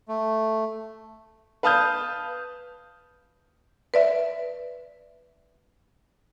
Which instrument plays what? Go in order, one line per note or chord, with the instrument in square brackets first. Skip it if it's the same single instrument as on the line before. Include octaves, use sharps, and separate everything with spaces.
[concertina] A3
[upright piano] B4 F5 A5 D#6 F6 G6
[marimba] B4 D5 E5